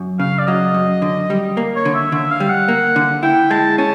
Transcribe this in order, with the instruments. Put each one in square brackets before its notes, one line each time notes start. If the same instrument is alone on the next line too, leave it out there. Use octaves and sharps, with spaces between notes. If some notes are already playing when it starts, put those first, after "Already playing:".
Already playing: [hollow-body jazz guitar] F#2
[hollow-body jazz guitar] C#3 [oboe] F5
[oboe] D5
[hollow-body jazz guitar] F#3 [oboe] D#5
[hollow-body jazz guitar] F#2
D3
G3
A#3
[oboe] C#5
[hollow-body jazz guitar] D3
[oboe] E5
[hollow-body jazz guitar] D3 [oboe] E5
[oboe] F5
[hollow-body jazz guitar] G3
[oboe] F#5
[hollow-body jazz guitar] A#3
D3
[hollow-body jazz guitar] E4 [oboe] G5
[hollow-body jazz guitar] G#3 [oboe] A5
[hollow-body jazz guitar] C#4 [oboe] A5